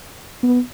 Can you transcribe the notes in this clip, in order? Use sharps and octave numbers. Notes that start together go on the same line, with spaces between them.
B3